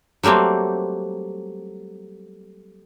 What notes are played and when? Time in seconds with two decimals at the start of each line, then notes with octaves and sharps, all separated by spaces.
0.23 F#3 G3 A3 A#3 C4